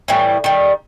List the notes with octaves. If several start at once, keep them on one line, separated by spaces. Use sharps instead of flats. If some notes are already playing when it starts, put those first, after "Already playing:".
A2 E3 G3
D#3 G3